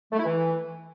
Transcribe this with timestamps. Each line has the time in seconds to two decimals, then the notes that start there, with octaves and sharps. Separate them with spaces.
0.12 A3
0.19 E4
0.25 E3